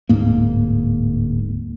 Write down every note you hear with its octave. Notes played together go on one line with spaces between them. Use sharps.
D1 G#2 A#3